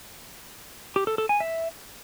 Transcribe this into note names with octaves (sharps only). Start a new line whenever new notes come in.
G4
A4
A4
G#5
E5